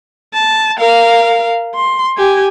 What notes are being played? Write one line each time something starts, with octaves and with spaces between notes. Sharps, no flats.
A5
A#4 F5
C6
G4 G#5